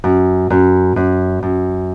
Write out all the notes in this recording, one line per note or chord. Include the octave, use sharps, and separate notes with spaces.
F#2
F#2
F#2
F#2